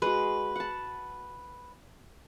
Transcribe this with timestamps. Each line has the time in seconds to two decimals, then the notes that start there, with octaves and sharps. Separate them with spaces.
0.02 G#3 F#4 B4
0.56 F#5 A5